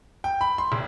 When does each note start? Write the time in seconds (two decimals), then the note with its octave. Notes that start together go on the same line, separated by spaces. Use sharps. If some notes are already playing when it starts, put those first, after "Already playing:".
0.24 G5
0.41 B5
0.58 C6
0.72 D#1